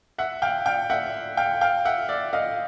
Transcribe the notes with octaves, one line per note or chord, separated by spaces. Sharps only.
E5 F#5
F5 G5
F5 G5
E5 F#5
F5 G5
F5 G5
E5 F#5
D5 E5
D#5 F5